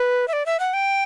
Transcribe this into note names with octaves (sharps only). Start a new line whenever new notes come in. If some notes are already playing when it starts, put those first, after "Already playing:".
Already playing: B4
E5
D5
E5
F#5
G5